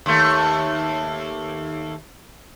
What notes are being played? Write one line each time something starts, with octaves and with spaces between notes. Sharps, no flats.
D#2 A3